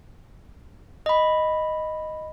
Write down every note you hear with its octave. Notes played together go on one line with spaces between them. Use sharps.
D#5 B5